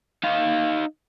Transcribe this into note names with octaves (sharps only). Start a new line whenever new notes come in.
D#4 F5